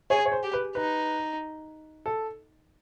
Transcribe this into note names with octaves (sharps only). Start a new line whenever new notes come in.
G#4 C#5
C#5
C5
G4
B4
D#4 B4
A4